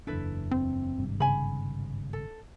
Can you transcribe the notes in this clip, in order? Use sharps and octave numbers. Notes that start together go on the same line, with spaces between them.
F#1 E2 D4 E4 A4 B4
C4
G#1 G2 C3
C#3 G#5 B5
A4